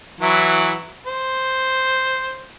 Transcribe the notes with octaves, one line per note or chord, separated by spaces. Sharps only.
E3 F#3 E4
C5